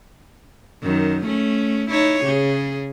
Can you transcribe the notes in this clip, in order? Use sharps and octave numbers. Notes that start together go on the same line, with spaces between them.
F#2 D#3
A3 C#4
D#4 E4 C#5
C#3 G#4